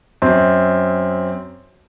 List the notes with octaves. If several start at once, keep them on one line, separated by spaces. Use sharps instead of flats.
F#2 C4